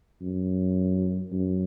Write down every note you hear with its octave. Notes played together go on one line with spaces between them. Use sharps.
F#2
F#2